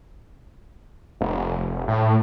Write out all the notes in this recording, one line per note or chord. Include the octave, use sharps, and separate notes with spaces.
F1
A2